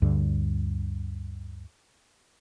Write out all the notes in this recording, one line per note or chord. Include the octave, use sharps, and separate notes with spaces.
D2 G2 D3